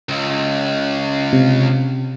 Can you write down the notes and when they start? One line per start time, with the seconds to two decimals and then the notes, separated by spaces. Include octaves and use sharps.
0.09 C#2
1.33 C3